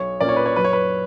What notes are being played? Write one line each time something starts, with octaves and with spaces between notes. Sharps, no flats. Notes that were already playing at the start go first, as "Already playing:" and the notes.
Already playing: B1 C#5
A#2 A#3 C#4 D5
C#5
B4
C#5
F#2 B4
C#5
B4